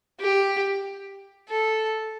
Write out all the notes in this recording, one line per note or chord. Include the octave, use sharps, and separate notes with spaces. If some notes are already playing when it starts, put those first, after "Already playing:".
G4
A4